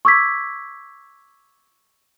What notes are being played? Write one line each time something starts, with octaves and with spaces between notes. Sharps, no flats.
C#6 D6 E6 G#6 B6